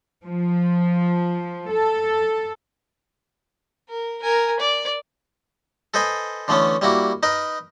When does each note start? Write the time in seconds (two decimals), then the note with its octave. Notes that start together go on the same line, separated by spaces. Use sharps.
0.24 F3
1.70 A4
3.89 A#4
4.22 A#4 G#5
4.60 D5
5.94 A4 B4 C5 D#5 G#5
6.48 D3 E3 A3 B3 C#4
6.82 G3 A#3 E4 F#4
7.23 D#4 A#4 B4 D#5